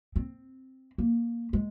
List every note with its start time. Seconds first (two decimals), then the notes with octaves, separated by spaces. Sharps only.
0.16 C4
0.98 A#3
1.53 G#3